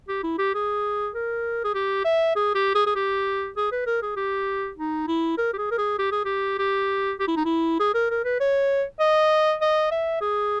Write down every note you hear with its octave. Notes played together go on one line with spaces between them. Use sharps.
G4
E4
G4
G#4
A#4
G#4
G4
E5
G#4
G4
G#4
G#4
G4
G#4
B4
A#4
G#4
G4
D#4
E4
A#4
G4
G#4
A#4
G#4
G4
G#4
G4
G4
G4
E4
D#4
E4
G#4
A#4
A#4
B4
C#5
D#5
D#5
E5
G#4